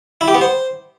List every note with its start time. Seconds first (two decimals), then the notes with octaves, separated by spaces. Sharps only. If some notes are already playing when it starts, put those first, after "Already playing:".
0.21 E4
0.28 G4
0.35 B3
0.41 C5